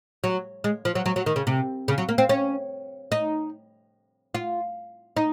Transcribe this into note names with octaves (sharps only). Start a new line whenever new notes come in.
F#3
G#3
F3
F#3
F#3
F#3
D#3
C#3
C3
C#3
F#3
A#3
C4
C#4
D#4
F4
D#4